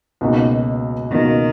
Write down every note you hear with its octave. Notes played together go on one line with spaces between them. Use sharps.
C#2 B2 A#3 D#4 F#4
C#2 B2 D#3 A#3 D#4 F#4